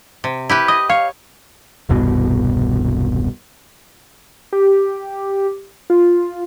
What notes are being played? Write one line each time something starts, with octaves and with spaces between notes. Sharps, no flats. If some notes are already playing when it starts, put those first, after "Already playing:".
C3
E4 G4 B4
D#5 D#6
C#5 F5
E1 C2 G2 B2
G4
F4